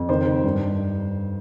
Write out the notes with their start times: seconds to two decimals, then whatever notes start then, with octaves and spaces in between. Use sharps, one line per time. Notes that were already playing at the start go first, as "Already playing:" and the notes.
Already playing: F2
0.09 D#3 C5
0.26 D#3
0.44 G2